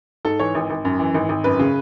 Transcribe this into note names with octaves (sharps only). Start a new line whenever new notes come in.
G#2 A4
E3 C#5
G#1
G#1
F#2
E3
G#1
G#1
F#2 B4
C#3